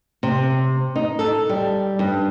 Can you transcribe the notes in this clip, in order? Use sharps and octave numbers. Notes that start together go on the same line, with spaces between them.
C3
D#4
A4
G3
G2